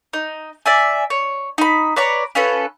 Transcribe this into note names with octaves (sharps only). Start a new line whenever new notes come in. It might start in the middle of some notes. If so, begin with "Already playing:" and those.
D#4
D5 E5 G#5
C#5
D#4 B5
B4 C#5 D5 A#5
C#4 F4 A4 B4